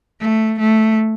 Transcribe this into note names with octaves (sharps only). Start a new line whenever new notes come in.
A3
A3